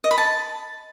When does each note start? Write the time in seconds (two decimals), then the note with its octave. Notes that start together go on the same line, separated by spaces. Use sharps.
0.04 D#5
0.11 B5
0.18 A5